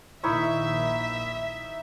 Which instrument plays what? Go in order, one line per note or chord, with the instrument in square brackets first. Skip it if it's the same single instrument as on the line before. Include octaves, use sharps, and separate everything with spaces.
[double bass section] A#1 A#2 D#3 [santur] D#4 E4 C#6 [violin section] E5